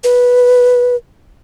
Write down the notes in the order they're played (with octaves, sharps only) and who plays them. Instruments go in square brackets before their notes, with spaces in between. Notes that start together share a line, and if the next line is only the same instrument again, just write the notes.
[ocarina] B4